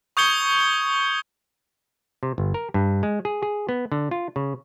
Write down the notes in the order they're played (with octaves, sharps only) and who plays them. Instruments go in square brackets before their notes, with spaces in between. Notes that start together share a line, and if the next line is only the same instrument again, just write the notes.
[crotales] C#6 D#6 G6 G#6 C#7 G7
[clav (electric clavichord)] C3
G1
A#4
G2
G#3
G#4
G#4
B3
D3
F4
C#3